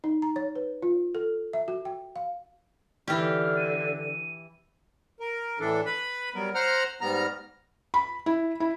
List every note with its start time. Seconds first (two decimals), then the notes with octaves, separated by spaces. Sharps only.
0.04 D#4
0.22 A#5
0.36 C#5
0.55 B4
0.83 F4
1.15 A4
1.53 E5
1.68 F#4
1.85 G5
2.16 F5
3.08 D3 E3 G4 F6
3.57 D#7
5.20 A#4
5.60 A2 E3 D4 A4
5.85 B4 B5
6.34 F#3 G3 B3 A#4
6.55 C5 F#5 A#5 F6
7.01 G#2 G3 B3 A#5 F6
7.94 B5
8.26 E4
8.60 E4